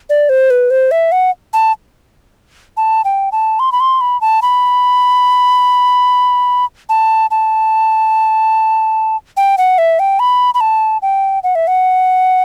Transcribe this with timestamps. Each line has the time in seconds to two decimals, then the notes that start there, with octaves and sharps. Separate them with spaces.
0.10 D5
0.29 C5
0.50 B4
0.71 C5
0.91 E5
1.12 F#5
1.53 A5
2.77 A5
3.05 G5
3.32 A5
3.59 C6
3.72 B5
3.80 C6
4.01 B5
4.21 A5
4.42 B5
6.89 A5
7.31 A5
9.37 G5
9.58 F#5
9.78 E5
9.99 G5
10.20 B5
10.54 B5
10.61 A5
11.02 G5
11.43 F#5
11.55 E5
11.67 F#5